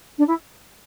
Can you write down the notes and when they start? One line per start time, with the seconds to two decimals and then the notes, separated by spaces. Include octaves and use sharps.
0.18 D4
0.27 E4